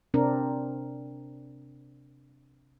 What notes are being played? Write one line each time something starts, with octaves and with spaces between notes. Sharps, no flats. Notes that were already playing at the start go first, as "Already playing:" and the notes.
C3 C4 D4 A#4